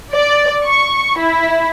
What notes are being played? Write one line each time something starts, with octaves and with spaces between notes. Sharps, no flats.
D5
C#6
E4